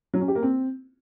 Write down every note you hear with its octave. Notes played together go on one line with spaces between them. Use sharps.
F#3
C#4
G4
A#3
C4